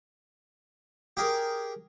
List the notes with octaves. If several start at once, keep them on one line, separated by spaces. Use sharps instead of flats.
G4 G#4 A#4